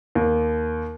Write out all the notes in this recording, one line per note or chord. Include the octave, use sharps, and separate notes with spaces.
D#2